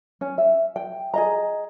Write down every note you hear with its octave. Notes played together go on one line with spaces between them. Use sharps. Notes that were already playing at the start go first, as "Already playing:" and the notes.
C#4
E5
G5
G#4 D#5 A#5